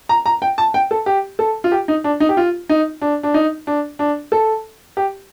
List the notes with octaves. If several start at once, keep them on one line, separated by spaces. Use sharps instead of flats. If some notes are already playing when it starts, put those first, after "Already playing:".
A#5
A#5
G5
A5
G5
A4
G4
A4
F4
G4
D#4
D4
D#4
G4
F4
D#4
D4
D4
D#4
D4
D4
A4
G4